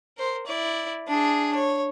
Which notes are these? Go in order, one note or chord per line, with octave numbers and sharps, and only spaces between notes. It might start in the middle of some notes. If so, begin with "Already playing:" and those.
A#4 C5
E4 D5
D4 G#4
C#5